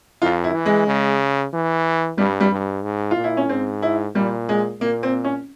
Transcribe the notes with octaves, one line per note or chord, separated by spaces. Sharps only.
F2 F4
E4
E3
G#3
C#3
E3
G2 G3
G3
G2
G#2
F4
A#2
E4
C#4
G#2 C4
E4
A#2 G3
G#3
A#2 A#3
C4
C#4